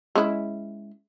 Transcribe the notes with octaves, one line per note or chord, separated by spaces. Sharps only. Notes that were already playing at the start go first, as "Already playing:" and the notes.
G#3 C#4 E4